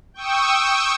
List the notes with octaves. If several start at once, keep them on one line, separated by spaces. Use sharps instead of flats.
G5 C#6 D#6 E6